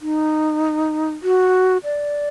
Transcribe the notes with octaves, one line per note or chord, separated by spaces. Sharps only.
D#4
F#4
D5